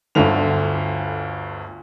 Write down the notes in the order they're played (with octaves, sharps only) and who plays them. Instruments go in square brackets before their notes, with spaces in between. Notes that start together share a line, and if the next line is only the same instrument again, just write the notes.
[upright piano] G1 D2 D3 F7